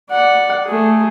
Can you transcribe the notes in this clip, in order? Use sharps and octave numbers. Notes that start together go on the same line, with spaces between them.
D5 F#5
A3 G#4